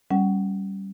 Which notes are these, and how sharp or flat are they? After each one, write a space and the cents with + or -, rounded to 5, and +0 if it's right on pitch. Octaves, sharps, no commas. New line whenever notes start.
G3 -10 C#4 -5 F#5 +20